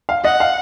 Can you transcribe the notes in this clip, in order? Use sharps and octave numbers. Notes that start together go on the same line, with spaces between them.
F5
D#5 F#5
F5